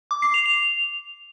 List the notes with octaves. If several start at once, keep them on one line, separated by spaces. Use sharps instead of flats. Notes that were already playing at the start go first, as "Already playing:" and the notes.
D6
C7
F7
F7